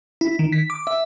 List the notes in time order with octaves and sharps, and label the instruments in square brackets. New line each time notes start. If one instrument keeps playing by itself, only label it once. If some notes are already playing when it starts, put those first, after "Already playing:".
[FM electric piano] E4
D#3
B6
D6
E5